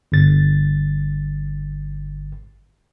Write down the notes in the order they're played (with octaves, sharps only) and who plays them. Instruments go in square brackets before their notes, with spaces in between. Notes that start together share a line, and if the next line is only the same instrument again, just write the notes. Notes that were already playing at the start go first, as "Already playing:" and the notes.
[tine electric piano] G1 A6